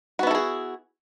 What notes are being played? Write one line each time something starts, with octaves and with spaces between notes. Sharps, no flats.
B3 E4 F#4 G#4 A4